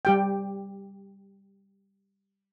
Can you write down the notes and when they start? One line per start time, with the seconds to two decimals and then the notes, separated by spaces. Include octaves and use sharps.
0.05 G3 G4 G5